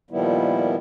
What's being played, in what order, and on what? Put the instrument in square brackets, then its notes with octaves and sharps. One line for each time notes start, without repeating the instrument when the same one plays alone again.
[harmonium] A#2 D#3 F3 G3 B3 E4